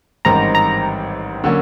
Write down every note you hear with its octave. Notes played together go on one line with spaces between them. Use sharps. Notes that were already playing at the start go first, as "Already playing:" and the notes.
A1 G#2 D#3 G3 C4 A#5
A#5
D3 F#3 A#3 C#4